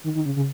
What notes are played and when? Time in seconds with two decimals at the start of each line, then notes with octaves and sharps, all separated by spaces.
0.04 D#3
0.15 D#3
0.26 C#3
0.36 C#3